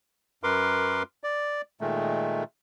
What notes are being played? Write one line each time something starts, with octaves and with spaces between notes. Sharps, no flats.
F#2 A#4 B4 C6 D6
D5
A#2 D#3 G#3 A3